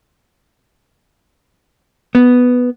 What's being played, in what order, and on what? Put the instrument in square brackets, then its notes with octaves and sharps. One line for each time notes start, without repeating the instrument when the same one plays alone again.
[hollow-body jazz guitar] B3